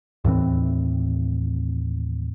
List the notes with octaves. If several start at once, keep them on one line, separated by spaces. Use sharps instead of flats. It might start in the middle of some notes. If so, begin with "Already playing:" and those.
D#2 A2 E3 C4